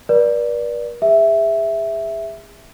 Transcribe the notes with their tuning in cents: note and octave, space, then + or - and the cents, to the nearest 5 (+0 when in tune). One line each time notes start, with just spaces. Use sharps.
B4 -45 D5 +0
G#4 -30 E5 +0